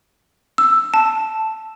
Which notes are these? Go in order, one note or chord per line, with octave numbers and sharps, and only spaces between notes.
E6
A5